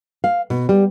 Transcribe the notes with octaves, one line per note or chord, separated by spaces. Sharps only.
F5
B2
G3